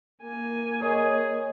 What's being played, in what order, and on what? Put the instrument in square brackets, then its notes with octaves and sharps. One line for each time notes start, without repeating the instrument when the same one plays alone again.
[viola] A#3 G#5
[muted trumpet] G#4 [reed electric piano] A#4 C#5 D#5